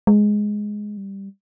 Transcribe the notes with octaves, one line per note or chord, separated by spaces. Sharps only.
G#3
G3